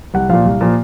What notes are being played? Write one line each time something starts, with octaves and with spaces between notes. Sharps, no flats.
C2 F#5
A#2 F3 F5
C2
A#2 F3